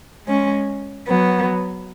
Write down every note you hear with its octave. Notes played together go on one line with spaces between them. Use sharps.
G#3 C#4
F#3 B3